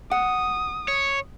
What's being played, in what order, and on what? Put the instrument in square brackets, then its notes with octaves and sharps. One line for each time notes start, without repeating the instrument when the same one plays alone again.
[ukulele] F#5 [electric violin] D#6
[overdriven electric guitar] C#5